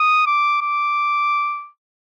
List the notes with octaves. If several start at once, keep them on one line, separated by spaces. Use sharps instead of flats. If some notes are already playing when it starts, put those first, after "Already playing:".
Already playing: D#6
D6
D6